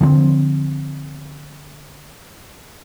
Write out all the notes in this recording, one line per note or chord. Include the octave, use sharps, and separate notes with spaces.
D3 F3 G3 C4